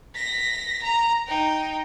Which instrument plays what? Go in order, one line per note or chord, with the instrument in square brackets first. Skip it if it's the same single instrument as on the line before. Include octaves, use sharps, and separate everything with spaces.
[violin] A#6 B6
A#5
D#4 G5